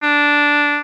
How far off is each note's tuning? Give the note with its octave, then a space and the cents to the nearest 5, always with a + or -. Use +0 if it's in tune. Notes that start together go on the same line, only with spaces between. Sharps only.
D4 -5